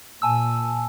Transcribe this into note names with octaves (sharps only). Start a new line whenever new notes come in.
A#2 G#5 A5 E6